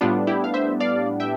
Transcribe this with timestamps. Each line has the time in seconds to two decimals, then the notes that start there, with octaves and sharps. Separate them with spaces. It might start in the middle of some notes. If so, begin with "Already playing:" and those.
0.01 A2 G3 B3 D4 F4
0.27 E4 G4
0.44 F5
0.54 C5 E5
0.80 D5 F5
1.20 E5 G5